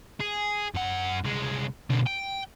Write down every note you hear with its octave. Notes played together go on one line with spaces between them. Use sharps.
G#4
F#2 F#5
C2 G#3
B2 D3
G5